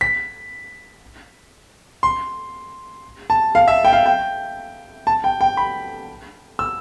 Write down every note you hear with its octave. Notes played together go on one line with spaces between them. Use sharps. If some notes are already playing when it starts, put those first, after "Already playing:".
B6
C6
A5
F5
E5
G5
F5
G5
A5
G5
G5
B5
E6